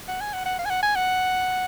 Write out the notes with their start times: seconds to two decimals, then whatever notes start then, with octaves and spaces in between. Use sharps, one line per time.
0.08 F#5
0.20 G#5
0.33 F#5
0.45 F#5
0.59 F5
0.65 G#5
0.70 F#5
0.82 G#5
0.95 F#5